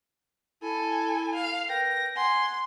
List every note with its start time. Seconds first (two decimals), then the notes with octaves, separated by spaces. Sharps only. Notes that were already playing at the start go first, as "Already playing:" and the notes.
0.63 E4 A4 G#5
1.35 F5
1.69 A#4 B4 G5 A#6
2.16 F#5 G#5 C6